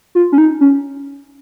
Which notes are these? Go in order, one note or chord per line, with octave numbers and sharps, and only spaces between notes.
F4
C#4
D#4
C#4